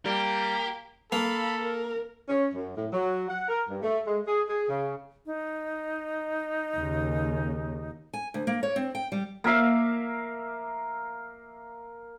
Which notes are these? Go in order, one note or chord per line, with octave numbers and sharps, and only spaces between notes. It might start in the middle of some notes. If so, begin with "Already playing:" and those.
G3 A#3 G4
A#3 A4 F5 B5
A#4
C#4
F#2
A2
F#3
F#5
A#4
G2
A3
G#3
G#4
G#4
C#3
D#4
D#2 C#3
G#5
D2
A#3
C#5
C4
G5
G3
A#3 A#4 E5 F5